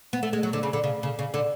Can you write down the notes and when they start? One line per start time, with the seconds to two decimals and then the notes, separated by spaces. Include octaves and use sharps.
0.13 B3
0.23 A3
0.33 G#3
0.43 F#3
0.53 D3
0.63 C#3
0.73 D3
0.84 C#3
1.03 C#3
1.19 C#3
1.34 D3